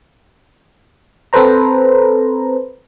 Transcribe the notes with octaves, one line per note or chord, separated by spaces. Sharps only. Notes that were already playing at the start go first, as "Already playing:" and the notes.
C4 A4 B4 C5 A#5